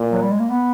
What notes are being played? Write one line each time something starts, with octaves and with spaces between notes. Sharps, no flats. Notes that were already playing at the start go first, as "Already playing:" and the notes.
Already playing: A#2
F#3
G3
G#3
A#3
B3